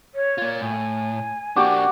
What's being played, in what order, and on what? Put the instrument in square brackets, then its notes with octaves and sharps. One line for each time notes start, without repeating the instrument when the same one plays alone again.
[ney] C#5
[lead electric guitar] A#3 F4
[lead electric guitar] A2 [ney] G#5
[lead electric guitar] A#3 D4 [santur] F#4 G4 D6